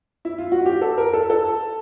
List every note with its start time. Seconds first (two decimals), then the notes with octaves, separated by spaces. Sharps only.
0.25 E4
0.38 F4
0.52 F#4
0.66 G4
0.81 A4
0.98 A#4
1.13 A4
1.30 A4